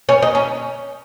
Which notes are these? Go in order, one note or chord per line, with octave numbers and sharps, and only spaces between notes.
C#4
D#4
C#4